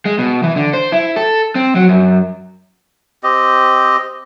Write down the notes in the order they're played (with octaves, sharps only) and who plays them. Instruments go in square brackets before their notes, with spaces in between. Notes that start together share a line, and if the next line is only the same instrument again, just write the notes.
[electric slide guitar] G#3
B2
E3
D3
C5
E4
A4
C4
F#3
F#2
[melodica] C4 G4 D#5